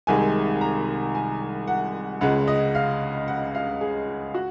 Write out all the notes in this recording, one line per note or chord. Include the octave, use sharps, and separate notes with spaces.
C2 C3 D#3 G#3 G#5
A#5
G#5
F#5
C#2 C#3 G#3 F#5
D#5
F5
F#5
F5
G#4
F#4